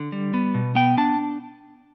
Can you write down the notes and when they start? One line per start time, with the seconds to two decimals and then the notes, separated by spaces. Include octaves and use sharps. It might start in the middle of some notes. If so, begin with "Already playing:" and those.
Already playing: D3
0.12 G3
0.34 B3
0.54 B2
0.75 B3 G5
0.97 D4 A5